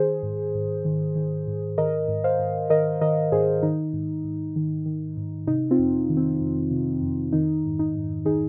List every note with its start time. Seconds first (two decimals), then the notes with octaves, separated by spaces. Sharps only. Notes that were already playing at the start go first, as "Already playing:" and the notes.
Already playing: D#3 G#4 C5
0.23 G#2
0.55 G#2
0.85 D#3
1.16 D#3
1.47 G#2
1.78 D#3 A#4 D#5
2.08 G#2
2.24 C5 F5
2.39 G#2
2.70 D#3 A#4 D#5
3.01 D#3 A#4 D#5
3.32 G#2 G#4 C5
3.63 D#3 D#4
3.93 G#2
4.24 G#2
4.56 D#3
4.86 D#3
5.17 G#2
5.47 C3 D#4
5.71 C4 F4
5.79 F2
6.10 D#3
6.17 C4
6.41 F2
6.71 C3
7.02 F2
7.33 D#3 D#4
7.64 G#2
7.79 D#4
7.95 G#2
8.25 D#3 D#4 G#4